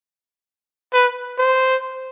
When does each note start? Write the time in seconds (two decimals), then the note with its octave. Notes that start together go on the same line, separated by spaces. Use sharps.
0.93 B4
1.38 C5